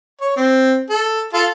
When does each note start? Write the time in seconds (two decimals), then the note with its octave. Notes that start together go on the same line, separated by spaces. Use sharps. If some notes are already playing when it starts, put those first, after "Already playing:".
0.21 C#5
0.36 C4
0.90 A4
1.33 F4 A4